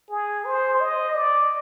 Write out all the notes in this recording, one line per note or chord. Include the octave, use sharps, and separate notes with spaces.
G#4
C5
D#5
D5